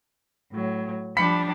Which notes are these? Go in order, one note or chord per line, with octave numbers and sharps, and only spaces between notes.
A2 F#3
F3 G3 D4 B5 B6 C#7